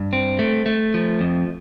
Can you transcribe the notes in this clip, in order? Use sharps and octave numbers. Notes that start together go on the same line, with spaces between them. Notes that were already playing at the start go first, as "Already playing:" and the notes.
Already playing: G2
C4
A3
A3
F3
F2